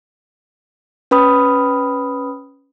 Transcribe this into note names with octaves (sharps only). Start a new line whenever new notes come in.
C#4 B4 B5 D#6